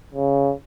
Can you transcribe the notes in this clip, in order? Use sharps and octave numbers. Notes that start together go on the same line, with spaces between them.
C#3